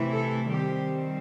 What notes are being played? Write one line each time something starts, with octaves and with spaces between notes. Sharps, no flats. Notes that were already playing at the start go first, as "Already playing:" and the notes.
Already playing: C3 E3 A3 E4
A4
D#3 G3 C4 G4